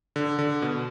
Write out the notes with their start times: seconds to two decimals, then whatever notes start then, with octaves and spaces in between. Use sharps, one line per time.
0.16 D3
0.39 D3
0.62 B2